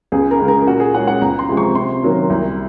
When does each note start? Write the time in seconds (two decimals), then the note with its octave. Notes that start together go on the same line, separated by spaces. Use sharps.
0.12 C#2 G#4
0.31 A#4
0.40 C#3 G#3
0.48 A#4
0.67 A#2 F#4
0.80 G#4
0.94 G#3 C#4 F#5
1.08 F#5
1.21 C#2 A#5
1.39 C6
1.49 C3 F3 G#3
1.57 C#6
1.75 C3 C6
2.03 D#3 F#3 A#3
2.30 C2